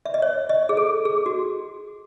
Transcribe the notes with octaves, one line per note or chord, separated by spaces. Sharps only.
E5
D#5
C#5
D#5
G#4
A4
G#4
F#4